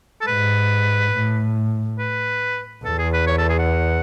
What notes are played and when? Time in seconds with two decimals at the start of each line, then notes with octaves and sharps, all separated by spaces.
0.21 A4
0.27 G#2 B4
1.13 A2
1.99 B4
2.85 E2 A4
2.98 G#4
3.13 B4
3.27 C#5
3.38 A4
3.49 G#4
3.59 F#5